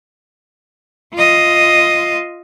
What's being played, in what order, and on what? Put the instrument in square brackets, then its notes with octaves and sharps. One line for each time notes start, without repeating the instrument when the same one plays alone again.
[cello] F4 D#5